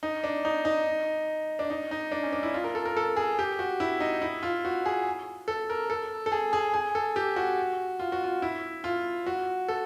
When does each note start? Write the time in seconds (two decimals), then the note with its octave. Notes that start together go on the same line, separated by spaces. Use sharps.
0.03 D#4
0.24 D4
0.45 D#4
0.65 D#4
1.59 D4
1.70 D#4
1.91 D#4
2.12 D4
2.23 C#4
2.32 D4
2.43 E4
2.54 F4
2.64 A#4
2.75 A4
2.85 A#4
2.97 A4
3.17 G#4
3.39 G4
3.59 F#4
3.80 E4
4.00 D#4
4.22 E4
4.43 F4
4.65 F#4
4.86 G#4
5.48 A4
5.70 A#4
5.90 A4
6.26 A4
6.32 G#4
6.53 G#4
6.74 G#4
6.95 A4
7.16 G4
7.36 F#4
8.00 F4
8.12 F#4
8.24 F4
8.42 E4
8.84 F4
9.26 F#4
9.68 A4